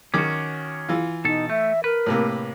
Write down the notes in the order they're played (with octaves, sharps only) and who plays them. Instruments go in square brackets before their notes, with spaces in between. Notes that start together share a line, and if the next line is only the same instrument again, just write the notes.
[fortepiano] D#3 D6 [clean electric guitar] C#4 F#4
[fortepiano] E3 F4
[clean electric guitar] B2 A4 [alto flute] D#4
[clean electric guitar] A3 [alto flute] E5
[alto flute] A#4 [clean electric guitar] B4
[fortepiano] A2 C3 A#3